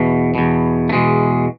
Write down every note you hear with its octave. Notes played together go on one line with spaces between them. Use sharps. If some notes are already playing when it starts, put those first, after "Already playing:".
Already playing: E2 B2
E2 B2
A3
E2 B2 G#3